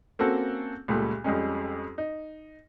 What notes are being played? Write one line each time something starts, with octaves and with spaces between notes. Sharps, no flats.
A#3 C4 C#4 F#4 A4
C#2 A#2 G3 A3
F2 G3 G#3 C#4
D#4